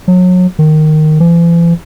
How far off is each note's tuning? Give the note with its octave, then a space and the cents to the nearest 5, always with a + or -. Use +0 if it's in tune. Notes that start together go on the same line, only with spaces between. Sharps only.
F#3 -30
D#3 -10
E3 +45